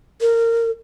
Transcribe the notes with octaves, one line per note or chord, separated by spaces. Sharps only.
A#4